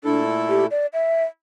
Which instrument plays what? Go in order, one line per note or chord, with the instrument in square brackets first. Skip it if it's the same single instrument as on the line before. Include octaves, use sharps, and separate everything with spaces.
[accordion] A#2 A3 E4 A4 [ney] D4
[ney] G4
D5
E5